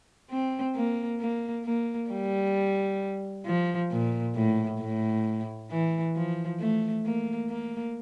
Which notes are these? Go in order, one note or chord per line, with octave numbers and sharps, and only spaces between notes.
C4
A#3
A#3
A#3
G3
F3
A#2
A2
A2
E3
F3
A3
A#3
A#3